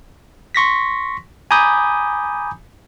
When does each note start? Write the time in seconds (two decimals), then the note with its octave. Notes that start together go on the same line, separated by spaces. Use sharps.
0.55 C6 C#6 A#6 B6
1.51 G#5 A#5 B5 D6 D#6 G6